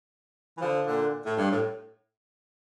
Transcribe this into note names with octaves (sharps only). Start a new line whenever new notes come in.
E3
D3 F3
A#2 D3
A2
G2
A2